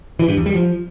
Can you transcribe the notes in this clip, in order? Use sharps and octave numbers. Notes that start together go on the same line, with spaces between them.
E3
G2
E2
G3
F3